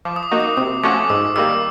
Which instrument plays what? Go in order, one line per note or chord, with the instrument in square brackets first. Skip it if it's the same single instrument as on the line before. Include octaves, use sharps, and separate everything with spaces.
[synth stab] F3 [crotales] D6
[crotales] D#6
D6
[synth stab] A#3 D#4 F#4
[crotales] D#6
[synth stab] C3 [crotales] D#6
[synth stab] F3 A3 C#4 F#4 [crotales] D6
[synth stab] G#2 [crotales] E6
[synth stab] D#3 G3 A#3 [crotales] E6